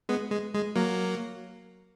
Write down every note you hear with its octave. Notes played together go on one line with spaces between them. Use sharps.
G#3 B3
G#3
G#3
F#3 A#3